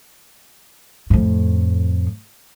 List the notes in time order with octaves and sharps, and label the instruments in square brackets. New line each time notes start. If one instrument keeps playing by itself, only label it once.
[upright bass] F2 A2